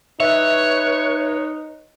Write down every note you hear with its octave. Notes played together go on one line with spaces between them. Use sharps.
D#4 B4 C#5 E5